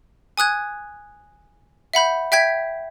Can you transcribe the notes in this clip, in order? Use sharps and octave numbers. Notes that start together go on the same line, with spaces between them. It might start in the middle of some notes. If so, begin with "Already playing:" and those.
G#5 D#6 F#6 G#6
E5 F#5 B5 G6
E5 G5 G6 G#6 B6